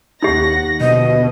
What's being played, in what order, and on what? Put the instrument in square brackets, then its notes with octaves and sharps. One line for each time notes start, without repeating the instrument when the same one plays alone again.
[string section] D#2 F#5 A#6 [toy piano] D#4 G4
[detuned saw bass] B2 [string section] D3 F3 [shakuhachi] D#5